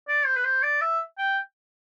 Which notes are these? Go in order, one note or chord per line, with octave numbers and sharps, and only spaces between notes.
D5
C5
B4
C5
D5
E5
G5